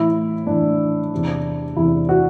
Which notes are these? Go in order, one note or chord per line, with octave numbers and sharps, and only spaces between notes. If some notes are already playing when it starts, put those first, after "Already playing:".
Already playing: A2 E3 E4
A2 E3 D4
E2 C3 E3
E2 C3 E3 E4
F#4